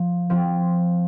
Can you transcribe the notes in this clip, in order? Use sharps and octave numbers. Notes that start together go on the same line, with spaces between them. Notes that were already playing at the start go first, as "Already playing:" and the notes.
Already playing: F3
F3 C4 F4